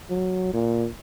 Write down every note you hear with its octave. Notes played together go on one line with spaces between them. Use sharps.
F#3
A#2